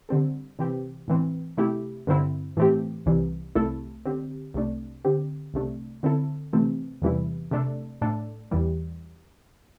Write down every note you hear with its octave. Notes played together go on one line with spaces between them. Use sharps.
D3 G3 C4 A4
C3 E3 C4 G4
A2 E3 C4
C3 A3 E4 G4
G2 D3 C4 E4
A2 E3 A3 C4 G4
C2 C3 E3 G3
C2 C3 A3 E4 A4
D3 C4 G4
C2 C3 A3 D4
D3 C4 G4
C2 C3 A3 D4
D3 C4 E4 A4
C3 E3 A3 C4
E2 C3 E3 G3 E4
C3 A3 D4 A4
A2 A3 D4 A4
E2 E3 G3